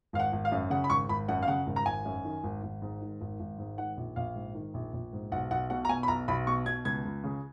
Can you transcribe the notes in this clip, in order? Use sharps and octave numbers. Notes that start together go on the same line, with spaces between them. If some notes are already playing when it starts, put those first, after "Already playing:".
G#1 F5
F#5
G#1
F5
F#2
C#3 F#5
B5
G#1 C#6
G#1 B5
F#2 F#5
F5
C#3 F#5
G#1
A#5
G#1 G#5
F#2
D#3
G#1
G#1
G#2
D#3
G#1
G#1
G#2
D#3 F#5
A#1
A#1 F5
G#2
D#3
A#1
A#1
G#2
B1 F#5
B1 F#5
B2 F#5
A#5
B2 G#5
B5
B1 A#5
B1 B5
B2 C#6
B2 G#6
C#2 G#6
C#2
C#3